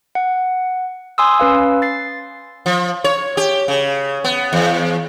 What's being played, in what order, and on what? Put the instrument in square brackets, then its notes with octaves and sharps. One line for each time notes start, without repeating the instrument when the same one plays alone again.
[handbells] F#5
G#5 C6 D#6 E6
C#4 B4 F5
A6 C7
[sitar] F3
C#5
G4
C#3
B3
E2